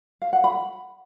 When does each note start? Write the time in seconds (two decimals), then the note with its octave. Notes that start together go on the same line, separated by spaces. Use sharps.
0.22 F5
0.33 F#5
0.44 B5